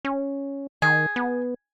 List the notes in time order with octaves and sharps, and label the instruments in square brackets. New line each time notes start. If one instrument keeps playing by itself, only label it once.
[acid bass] C#4
[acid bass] D#3 [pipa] G#4
[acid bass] B3